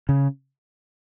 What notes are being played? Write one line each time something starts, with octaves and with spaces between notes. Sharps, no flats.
C#3